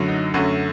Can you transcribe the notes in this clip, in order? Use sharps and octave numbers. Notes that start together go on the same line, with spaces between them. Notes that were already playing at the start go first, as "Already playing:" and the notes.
Already playing: F#2 D3 F#3 A3
D#4
F#2 D3 F#3 A3 F#4